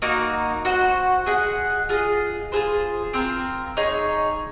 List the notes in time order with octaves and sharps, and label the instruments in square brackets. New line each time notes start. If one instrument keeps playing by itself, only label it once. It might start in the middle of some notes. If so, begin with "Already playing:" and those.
[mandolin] A#3 D#4 F#4
F#4 C5 F#5
G#4 D#5 F#5
F4 G#4 D#5
F4 G#4 C5
C4 F4 A#4
D#4 G#4 C#5